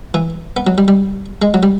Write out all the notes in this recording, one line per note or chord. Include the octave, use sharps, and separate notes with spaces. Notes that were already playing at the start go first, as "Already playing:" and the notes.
E3
B3
F#3
G3
G3
G#3
F#3
G3